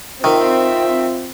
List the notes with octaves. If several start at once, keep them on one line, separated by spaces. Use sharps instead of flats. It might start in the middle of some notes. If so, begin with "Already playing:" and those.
D#3 C4 F4 E5